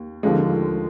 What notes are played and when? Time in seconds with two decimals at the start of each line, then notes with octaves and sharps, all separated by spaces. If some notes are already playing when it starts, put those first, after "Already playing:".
Already playing: D#2
0.23 D#2 D3 F3 G#3